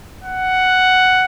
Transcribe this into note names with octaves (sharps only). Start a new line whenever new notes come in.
F#5